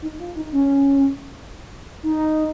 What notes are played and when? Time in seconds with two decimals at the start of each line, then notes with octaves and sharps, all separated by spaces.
0.02 D#4
0.19 F4
0.36 D#4
0.52 C#4
2.03 D#4